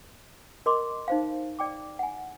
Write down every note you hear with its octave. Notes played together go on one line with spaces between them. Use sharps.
A#4 D#5 C6 D6
D#4 C5 F5
D5 G5 D6
F#5 G#5